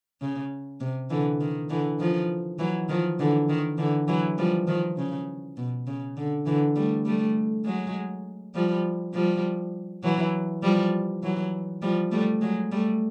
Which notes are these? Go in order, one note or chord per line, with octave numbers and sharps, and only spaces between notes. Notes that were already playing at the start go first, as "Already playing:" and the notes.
C#3
C3
D3 E3
D#3
D3 E3
D#3 F3
E3 F#3
D#3 F3
D3 E3
D#3
D3 E3
E3 F#3
F3 G3
D#3 F3
C#3
B2
C#3
D3
D3 E3
G3 A3
G3 A3
F#3 G#3
F3 G3
F3 G3
E3 F#3
F3 G3
E3 F#3
F3 G3
G3 A3
F#3 G#3
G3 A3